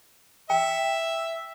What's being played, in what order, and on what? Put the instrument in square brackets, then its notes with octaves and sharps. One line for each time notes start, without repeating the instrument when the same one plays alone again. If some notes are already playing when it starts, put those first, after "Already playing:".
[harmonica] E5 [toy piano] G5